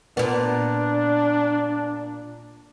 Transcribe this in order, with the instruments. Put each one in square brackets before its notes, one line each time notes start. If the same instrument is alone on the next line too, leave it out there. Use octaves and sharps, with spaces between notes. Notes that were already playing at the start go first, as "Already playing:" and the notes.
[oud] A#2 B3 [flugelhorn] D4